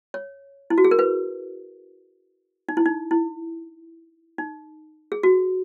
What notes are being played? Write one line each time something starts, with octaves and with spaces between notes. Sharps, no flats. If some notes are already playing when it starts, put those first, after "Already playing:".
C#5
E4
F#4
G#4
A#4
B4
D#4
E4
D#4
E4
D#4
G#4
F#4